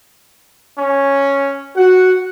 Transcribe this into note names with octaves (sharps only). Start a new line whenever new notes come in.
C#4
F#4 F#5